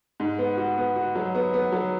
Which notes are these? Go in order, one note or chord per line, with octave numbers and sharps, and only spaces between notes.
G#2
B3
F#4
B3
F#4
F#3
B3
B3
F#3